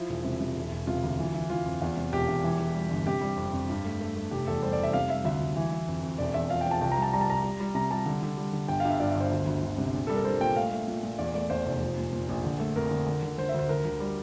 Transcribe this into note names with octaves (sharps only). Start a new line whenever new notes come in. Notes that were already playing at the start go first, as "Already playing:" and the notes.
Already playing: F3 E4
E1
C3
C3
E1
E1
C3 F4
D2
E3
E3
E3 F4
F2
E2
C3
E1 G4
E2
E3
E3
G3
G1
C3 G4
G3
F2
F2
G2
A3
A3
A3
F1 G4
E2 A4
G3 C5
D5
F1 E5
C3 F5
G3 E5
D2 E5
D2
E3
E3
F2
F2
E1 D5
E2 E5
F3 F5
G5
F3 A5
C2 G5
G3 A#5
A5
G3 A#5
A5
C2 A#5
G3
G3
C3 A#5
G3 A5
D3
D3
G3
D3
G1 G5
F5
G2
E5
G2 D5
G1 E5
C5
D2
D2
D2
C3
A#1
G3 A4
A#4
G3 C5
A#2 G5
A3 F5
A3
A#2
A#2
E2 D5
A3 D5
E2 C5
F1
F3
A#2
A#2
A#1
D3
A3
F2 A#4
D3
D3
D3
D3 C5
E5
D2 C5
D2 A#4
D2
G3